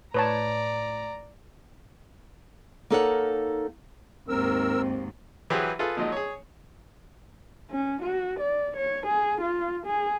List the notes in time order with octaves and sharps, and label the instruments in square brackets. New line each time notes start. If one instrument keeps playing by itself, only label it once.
[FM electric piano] A2 [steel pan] B4 C#5 A5 [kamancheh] D5 A#5
[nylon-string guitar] A#3 D#4 A4 A#4 C#5 F#5
[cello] D#2 G#2 [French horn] C4 [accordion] A#4 E6
[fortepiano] E3 F#3 G4 G#4 B4 C5
F4 G#4 A4 B4
A#2 F3 F#3 G#3 D#4
G#4 C#5
[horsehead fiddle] C#4
F#4
D5
C#5
G#4
F4
G#4